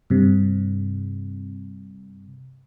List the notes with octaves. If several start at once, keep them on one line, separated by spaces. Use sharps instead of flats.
G2 C3